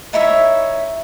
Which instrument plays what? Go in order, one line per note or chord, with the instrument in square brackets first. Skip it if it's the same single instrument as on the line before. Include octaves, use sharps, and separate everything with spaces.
[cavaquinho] D#4 E4 C#5 E5